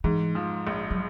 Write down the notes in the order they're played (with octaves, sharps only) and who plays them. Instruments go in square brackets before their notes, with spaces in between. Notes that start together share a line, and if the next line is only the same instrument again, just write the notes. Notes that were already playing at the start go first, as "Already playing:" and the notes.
[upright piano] G#2 [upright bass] E3
[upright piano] F3
A#1
[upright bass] F#3